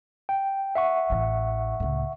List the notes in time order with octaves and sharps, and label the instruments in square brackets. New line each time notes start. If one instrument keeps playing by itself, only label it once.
[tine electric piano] G5
E5 F#5 C#6
[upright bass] A1 E3
C#2 A2